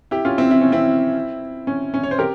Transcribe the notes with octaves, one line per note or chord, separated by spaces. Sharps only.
E4 G4
C#4 F4
C4 E4
E4
C#4
C4 E4
C#4
C#4
C#5
C5
G4 A#4